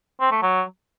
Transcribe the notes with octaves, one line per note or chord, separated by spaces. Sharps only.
C4
A3
F#3